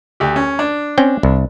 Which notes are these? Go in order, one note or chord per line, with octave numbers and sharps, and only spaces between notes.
D2 G4
C#4
D4
C4 C#4 G5
C2